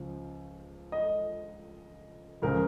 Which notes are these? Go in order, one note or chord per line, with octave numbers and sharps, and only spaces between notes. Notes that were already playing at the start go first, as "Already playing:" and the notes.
Already playing: C#2 C#3 F3
D#5
C#2 C#3 F3 A#4